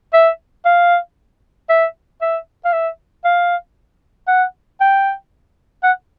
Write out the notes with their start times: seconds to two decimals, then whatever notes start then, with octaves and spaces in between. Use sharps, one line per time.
0.13 E5
0.65 F5
1.69 E5
2.22 E5
2.65 F5
2.73 E5
3.25 F5
4.28 F#5
4.81 G5
5.83 F#5